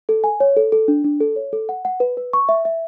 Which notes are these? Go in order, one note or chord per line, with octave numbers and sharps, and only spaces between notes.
A4
G#5
C#5
A4
A4
D4
D4
A4
C#5
A4
F#5
F#5
B4
B4
C#6
E5
E5